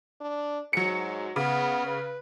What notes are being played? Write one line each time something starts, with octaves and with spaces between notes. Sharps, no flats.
D4
G#2 F#3 C#7
C#3 B3
B4